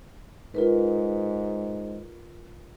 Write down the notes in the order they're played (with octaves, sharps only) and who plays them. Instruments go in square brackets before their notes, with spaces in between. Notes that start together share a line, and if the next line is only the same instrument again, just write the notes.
[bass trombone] G#2 [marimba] F4 A#4 B4